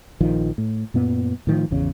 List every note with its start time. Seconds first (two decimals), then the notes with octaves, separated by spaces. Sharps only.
0.21 A#1 D#3 F3
0.58 A2
0.94 F#2 A#2 B3
1.47 A2 D#3 F3
1.71 G#1 E2 C#3